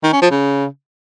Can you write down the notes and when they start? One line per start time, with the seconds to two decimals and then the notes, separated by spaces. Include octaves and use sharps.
0.03 D#3
0.12 C#4
0.22 F3
0.31 C#3